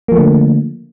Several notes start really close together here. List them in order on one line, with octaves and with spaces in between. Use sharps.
A#3 F3 A3 D3